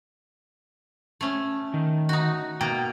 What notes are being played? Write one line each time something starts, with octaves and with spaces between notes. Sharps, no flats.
A3 C#4
D#3
D#4 F#4
B2 A#3 G5 A#5